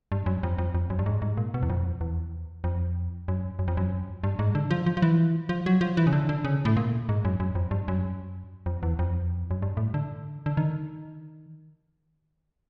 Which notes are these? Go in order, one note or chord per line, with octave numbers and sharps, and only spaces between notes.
G2
F#2
F2
F2
F2
F#2
G2
G#2
G#2
A#2
B2
E2
F2
E2
F2
F#2
F#2
F2
F#2
G2
G#2
D3
F3
F3
F3
E3
F3
F#3
F3
E3
C#3
D3
D3
C#3
A2
A#2
G#2
F#2
F#2
F2
G2
F#2
F2
E2
F2
F#2
G2
A2
D3
D3
D#3